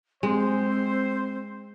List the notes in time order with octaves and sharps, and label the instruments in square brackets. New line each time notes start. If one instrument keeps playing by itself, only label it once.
[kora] G#3 [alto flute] C4 [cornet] C5